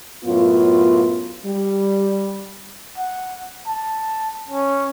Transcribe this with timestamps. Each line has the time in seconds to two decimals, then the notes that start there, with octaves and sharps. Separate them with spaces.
0.25 F#2 A2 B3 F4
1.46 G3
2.97 F#5
3.67 A5
4.49 C#4